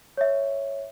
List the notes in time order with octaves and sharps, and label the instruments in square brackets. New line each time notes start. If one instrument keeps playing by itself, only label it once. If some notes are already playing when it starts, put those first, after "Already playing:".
[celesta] C#5 E5